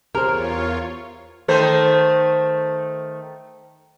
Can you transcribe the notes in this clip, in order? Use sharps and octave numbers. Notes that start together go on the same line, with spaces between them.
E2 F4 G4 G#4 A#4 C5 C#5
D#3 A3 C5